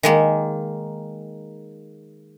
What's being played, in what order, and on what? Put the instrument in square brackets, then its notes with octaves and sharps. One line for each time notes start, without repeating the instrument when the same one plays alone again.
[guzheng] D#3 G#3 A#3